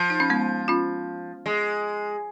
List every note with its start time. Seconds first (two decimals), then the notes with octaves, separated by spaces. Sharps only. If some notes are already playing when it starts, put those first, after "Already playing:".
Already playing: F3
0.10 D#4
0.20 C#4
0.30 G#3 B3
0.68 C#4 F4
1.46 G#3